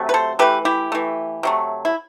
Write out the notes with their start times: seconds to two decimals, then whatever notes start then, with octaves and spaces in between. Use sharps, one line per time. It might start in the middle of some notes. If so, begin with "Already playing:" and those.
Already playing: C3 F#3 A3
0.09 B4
0.14 A4 C5
0.39 E3 A3 G4 B4
0.65 E4 G4
0.92 E3 A3
1.43 C3 F#3 A3
1.85 E4